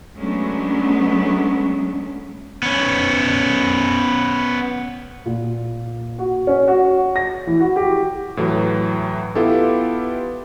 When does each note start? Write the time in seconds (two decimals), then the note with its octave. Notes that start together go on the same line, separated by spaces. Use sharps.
0.17 F#3 G#3 A3 B3 C#4 D4
2.63 B3 C#4
5.26 A#2
6.18 F#4
6.47 C#4
6.68 F#4
7.16 A#6
7.47 E3
7.60 F#4
7.76 G4
8.37 A2 E3 F#3
9.35 B3 E4 F4 G4 A4